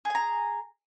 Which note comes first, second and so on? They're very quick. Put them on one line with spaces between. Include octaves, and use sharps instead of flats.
G#4 G#5 A#5